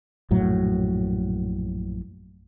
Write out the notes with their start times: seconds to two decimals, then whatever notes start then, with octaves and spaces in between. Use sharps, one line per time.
0.31 A#1 F#2 A2 F#3